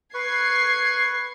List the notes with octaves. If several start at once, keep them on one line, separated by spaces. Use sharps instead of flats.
B4 C#6 G#6 C7